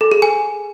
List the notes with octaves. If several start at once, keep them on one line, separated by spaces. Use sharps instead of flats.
A4
G#4
G#5